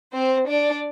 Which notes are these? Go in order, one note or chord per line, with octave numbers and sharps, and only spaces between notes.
C4 C5
D4 D5